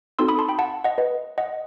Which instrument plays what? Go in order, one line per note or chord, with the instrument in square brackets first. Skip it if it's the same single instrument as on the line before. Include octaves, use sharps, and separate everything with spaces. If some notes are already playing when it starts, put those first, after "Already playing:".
[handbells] C4 D#4 F#4 A4 C6 E6
B5 D#6
A5 C6
G5 B5
F#5 A5
D#5 F#5
B4 D#5
D#5 F#5